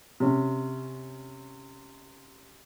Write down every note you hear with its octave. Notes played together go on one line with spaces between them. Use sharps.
C3 C#4